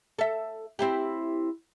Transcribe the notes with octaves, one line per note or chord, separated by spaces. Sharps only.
A4 E5
C4 E4 G4